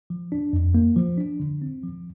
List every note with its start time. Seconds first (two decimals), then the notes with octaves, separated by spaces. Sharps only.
0.10 F3
0.32 D4
0.53 F2
0.75 A#3
0.96 F3
1.17 D4
1.40 D3
1.62 C4
1.83 F3